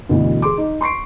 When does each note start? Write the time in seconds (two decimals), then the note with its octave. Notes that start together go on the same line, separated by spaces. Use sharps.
0.09 D2 B2 D3 E3
0.42 G#4 C6 D6
0.58 D#4
0.81 C6 C#6 C7 D7